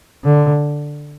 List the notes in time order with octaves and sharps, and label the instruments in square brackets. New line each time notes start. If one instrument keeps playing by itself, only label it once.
[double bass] D3